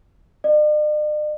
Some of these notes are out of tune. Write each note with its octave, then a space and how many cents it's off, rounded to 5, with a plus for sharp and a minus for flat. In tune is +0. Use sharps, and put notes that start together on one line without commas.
D5 +45